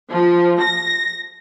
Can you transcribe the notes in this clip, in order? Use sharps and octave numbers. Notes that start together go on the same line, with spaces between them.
F3
A#6